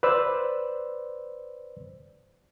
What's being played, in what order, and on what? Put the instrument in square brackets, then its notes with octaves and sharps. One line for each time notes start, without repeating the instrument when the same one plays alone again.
[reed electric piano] B4 C5 D5 E6